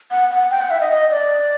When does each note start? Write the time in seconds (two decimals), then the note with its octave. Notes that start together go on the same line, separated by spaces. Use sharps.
0.11 F#5
0.31 F#5
0.51 G5
0.61 F#5
0.70 E5
0.81 D#5
0.91 D#5
1.10 D5